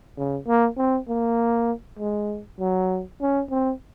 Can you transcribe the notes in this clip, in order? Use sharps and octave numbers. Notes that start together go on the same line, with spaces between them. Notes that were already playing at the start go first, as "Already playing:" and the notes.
C#3
A#3
C4
A#3
G#3
F#3
C#4
C4